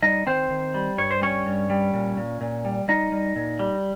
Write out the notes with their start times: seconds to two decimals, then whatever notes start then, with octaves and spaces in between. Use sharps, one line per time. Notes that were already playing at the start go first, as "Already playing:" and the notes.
0.02 G3 D#4 D#5
0.26 D#3 C4 C5
0.50 D#3
0.74 G3
0.98 G2 C#5
1.11 C5
1.21 G3 C#4 C#5
1.46 G2
1.70 G3
1.94 A#2
2.17 A#2
2.41 A#2
2.65 G3
2.88 G3 D#4 D#5
3.12 G3
3.36 A#2
3.59 G3